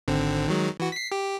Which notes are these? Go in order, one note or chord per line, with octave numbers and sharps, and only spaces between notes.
G#1 D3 C4
D#3 F#3 G#3
E3 F#4
B6 C7
G4